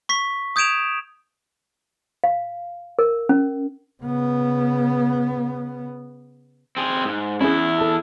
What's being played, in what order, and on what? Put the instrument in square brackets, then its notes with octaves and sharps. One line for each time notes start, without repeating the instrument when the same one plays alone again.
[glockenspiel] C#6 B6
D#6 G6 G#6 D7 E7 F7
[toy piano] F5
A#4
C#4
[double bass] C#3 B3
[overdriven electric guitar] C4 G#4
G#2
[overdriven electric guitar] E2 E4 [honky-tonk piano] C#4 G#4
[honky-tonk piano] A4 A5